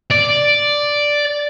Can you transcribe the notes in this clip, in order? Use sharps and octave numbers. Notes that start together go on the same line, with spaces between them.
D5